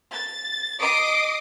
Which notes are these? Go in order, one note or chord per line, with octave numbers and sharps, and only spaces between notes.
A6
D#5 D6 D#6 C7 D7